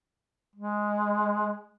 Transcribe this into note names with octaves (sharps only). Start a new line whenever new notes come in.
G#3